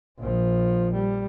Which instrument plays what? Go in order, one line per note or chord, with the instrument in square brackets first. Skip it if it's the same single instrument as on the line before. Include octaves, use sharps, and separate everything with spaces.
[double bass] A#1 F3
G3